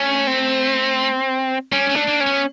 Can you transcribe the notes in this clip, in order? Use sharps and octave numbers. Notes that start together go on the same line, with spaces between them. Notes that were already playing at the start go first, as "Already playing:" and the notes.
Already playing: A3 C#4
C4
G3 C#4
A3
D4
A#3
C#4
B3